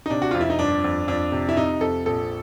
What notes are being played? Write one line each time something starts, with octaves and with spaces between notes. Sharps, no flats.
D#4
C3 D4
F#4
F2 F4
E4
D#4
G1 D4
F2
F2 D4
C3
E4
C3 D#4
F2 A4
A#1 A4